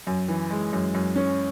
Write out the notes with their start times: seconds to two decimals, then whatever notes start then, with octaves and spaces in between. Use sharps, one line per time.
0.07 F#2
0.28 E3
0.50 G#3
0.73 F#2
0.94 F#2
1.16 C#4